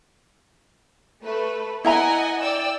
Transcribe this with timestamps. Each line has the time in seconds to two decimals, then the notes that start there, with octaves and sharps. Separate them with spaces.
1.23 A3 B4
1.85 E4 D#5 E5 F#5 G#5 A#5
2.41 D5 G5 E6